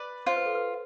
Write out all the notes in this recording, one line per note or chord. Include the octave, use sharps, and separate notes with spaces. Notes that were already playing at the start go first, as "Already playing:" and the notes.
Already playing: B4 D5
F4 C5
B4
A4
B4